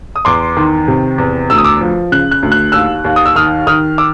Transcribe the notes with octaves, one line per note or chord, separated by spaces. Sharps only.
D#6
E2 C6 D6
D#3
C3
E2
D2 E6
D#6
D6 E6
F3
C#3 F#6
F#6
D2
F#6
D#2 E6 F#6
D#2
D#6
E6
D#3 D#6 F6
D#3 D#6 F6
D6 E6